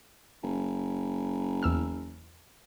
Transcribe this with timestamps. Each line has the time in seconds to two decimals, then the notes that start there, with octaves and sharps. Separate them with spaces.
0.43 F#1
1.63 E2 E6 F6